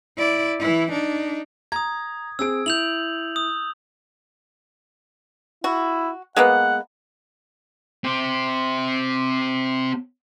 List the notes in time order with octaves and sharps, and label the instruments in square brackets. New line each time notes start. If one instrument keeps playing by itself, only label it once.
[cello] E4 D5
E3 E4
D4 D#4
[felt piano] A#5 [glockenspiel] D#6 G#6
[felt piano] C4 G#4 D7 [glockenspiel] E6
[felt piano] E4 [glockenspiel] G6 F7 F#7
[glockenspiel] D#6
[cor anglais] E4 [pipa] F#4
[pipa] G#3 A#3 B3 [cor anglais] F#5
[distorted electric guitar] C4 G4